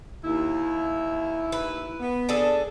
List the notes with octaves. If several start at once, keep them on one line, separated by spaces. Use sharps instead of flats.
D#2 E4
B4
B3
D4 G#4 A4